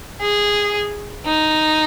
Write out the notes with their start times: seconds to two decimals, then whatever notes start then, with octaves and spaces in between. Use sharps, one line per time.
0.21 G#4
1.26 D#4